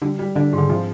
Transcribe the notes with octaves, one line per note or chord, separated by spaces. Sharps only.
D3 G3
G3
D3 D4
G#2
D3
C3 F3